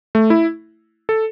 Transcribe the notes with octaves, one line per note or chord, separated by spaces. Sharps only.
A3
E4
A4